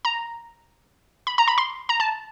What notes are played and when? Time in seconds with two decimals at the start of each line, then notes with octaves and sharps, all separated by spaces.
0.05 A#5
1.27 B5
1.38 A#5
1.48 B5
1.58 C6
1.89 A#5
2.00 A5